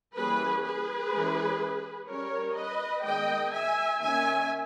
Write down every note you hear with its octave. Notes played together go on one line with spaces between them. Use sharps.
E3 G3 A#3 C#4 G#4 B4
G#4 B4
E3 G#3 C#4
G3 C#4 A#4 C#5
B4 D#5
D#3 G#3 B3 D#5 G5
E5 G#5
D#3 A#3 C#4 E5 G#5